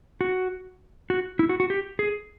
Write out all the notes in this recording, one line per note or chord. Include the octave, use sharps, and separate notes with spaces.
F#4
F#4
E4
F#4
F#4
G4
G#4